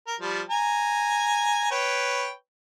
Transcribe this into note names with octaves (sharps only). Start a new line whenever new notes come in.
A#4
F3 G3
G#5 A#5
B4 C#5 G5